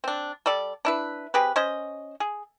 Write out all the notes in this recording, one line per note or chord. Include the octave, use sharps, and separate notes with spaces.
C4 D4
G3 A4 D5
D4 E4 B4
C4 G4 G#4 B4
C#4 C5 D#5
G#4